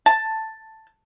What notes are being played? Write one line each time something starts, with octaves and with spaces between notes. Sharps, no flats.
A5